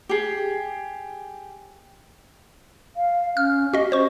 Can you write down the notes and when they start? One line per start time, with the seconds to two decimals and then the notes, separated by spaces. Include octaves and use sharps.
0.09 G4 G#4
2.97 F5
3.37 C#4 F6
3.74 F#4 G4 D#5
3.92 C#4 C5 C#6